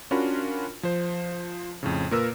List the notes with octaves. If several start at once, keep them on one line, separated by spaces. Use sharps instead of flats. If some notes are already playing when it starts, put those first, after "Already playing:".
C#4 D4 F4 F#4 A#4 B5
F3 C5
F2 A2 C#3
A#2 A#3 A#4 B4 E6